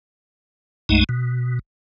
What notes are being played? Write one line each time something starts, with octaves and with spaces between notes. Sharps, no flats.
B1 F#2 G#3 A3 D#4
B2